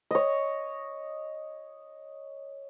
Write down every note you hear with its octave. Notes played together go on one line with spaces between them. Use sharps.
C#5 D#5